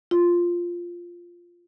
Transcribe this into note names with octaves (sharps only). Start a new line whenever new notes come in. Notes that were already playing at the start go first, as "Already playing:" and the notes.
F4